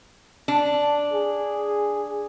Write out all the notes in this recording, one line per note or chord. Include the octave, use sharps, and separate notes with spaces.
D4
G#4